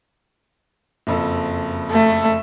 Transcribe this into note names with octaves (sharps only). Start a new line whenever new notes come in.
F#1 F2 A4
A3